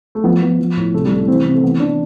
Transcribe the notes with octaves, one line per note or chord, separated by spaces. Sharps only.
A3
F3 B3
F3 B3
F3
A2
C2 A3
G3
C2 A3
E3 C4
C3 C4
A3
E3 B3
E3 D4